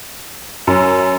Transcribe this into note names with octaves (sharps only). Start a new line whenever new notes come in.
F#2 C#4